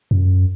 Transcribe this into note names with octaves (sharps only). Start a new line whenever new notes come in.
F#2